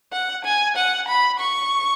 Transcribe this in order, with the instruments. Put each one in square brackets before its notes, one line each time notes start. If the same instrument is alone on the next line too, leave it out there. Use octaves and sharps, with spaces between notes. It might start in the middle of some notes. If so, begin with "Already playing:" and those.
[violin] F#5
G#5
F#5
B5
C#6